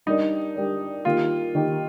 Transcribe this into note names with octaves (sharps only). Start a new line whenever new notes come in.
G3 D4 D#4 G4 A#4 D5
G3 D4 G4 A#4 D5
D#3 A#3 D#4 F4 G4
D#3 A#3 D#4 G4